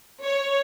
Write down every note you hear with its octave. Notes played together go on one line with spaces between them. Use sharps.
C#5